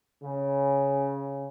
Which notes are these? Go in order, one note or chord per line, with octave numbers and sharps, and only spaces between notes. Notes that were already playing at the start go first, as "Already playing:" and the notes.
C#3